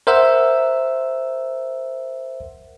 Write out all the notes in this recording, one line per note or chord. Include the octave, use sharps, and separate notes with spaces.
A#4 C5 E5 F#5 E6